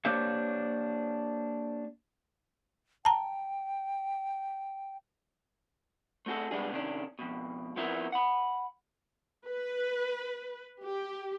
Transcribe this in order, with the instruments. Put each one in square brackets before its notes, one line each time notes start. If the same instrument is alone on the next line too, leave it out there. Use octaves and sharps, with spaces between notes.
[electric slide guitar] A#3 D4 G4 C5 C#5 F5
[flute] G5 [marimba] A5 A#5
[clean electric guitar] A3 C4 F#4 G#4 A4
C3 G3 G#3 B3 D4 G#4
C3 D#3 C#4 D4
F2 B2
F3 B3 C4 E4 A#4
F#5 B5
[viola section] B4
G4